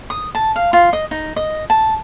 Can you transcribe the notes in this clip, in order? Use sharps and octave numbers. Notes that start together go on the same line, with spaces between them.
D#6
A5
F5
F4
D#5
D#4
D#5
A5